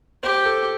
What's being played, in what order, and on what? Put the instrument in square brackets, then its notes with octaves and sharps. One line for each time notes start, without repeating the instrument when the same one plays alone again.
[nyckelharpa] G4 [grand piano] C5
[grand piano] A4